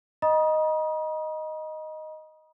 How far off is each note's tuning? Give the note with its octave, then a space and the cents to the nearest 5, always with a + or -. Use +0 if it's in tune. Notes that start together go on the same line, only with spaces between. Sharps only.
D#5 +0 A#5 +45 D#6 +0